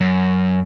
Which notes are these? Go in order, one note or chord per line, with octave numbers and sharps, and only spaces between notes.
F#2